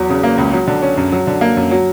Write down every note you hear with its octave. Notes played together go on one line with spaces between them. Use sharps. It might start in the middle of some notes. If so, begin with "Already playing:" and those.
Already playing: E2 F#3
C#3
A#3
C#2
F#3
D3
C#4
F#2
F#3
D3
A#3
F#2
F#3